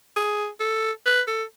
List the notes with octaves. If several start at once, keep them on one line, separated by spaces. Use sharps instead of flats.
G#4
A4
B4
A4